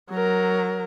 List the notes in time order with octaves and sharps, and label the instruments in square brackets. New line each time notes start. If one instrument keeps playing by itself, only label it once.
[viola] F#3 A#4